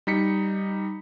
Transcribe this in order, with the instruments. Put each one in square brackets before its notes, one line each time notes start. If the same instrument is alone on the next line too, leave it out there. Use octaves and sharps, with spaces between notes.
[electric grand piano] G3 D#4 B6 C#7